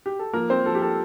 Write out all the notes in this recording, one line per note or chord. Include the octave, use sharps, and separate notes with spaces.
G4
A4
F3 A#3 A#4
C4 C5
F3 A4
G4
A4